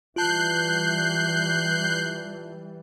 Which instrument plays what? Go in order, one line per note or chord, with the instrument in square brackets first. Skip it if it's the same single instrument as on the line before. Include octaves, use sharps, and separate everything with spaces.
[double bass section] E3 G3 [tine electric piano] F4 A5 [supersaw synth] F#6 G6 C7